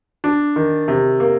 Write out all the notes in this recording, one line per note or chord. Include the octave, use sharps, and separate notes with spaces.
D4
D#3
C3
A#3